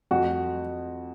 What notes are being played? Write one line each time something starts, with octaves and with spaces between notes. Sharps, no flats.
F2 F#4